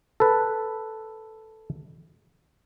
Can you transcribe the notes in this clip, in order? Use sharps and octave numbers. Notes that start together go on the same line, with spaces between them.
A4 B4